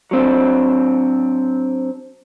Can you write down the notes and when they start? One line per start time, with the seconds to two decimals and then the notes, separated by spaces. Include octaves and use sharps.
0.11 F#3 C4 D4